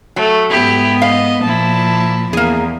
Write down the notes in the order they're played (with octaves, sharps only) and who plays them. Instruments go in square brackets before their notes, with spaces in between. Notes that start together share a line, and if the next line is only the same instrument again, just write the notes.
[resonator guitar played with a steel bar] F#3 [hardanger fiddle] A3
[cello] G#2 B3 [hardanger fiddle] E4 G4
[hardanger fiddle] D#5 [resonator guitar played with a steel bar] F5
[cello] A#2 F3 [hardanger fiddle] E4 A5
[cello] E2 [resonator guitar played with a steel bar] A#3 G#4